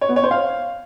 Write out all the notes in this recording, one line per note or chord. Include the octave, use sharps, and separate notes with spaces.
C#5
B3
C#5
C5
F5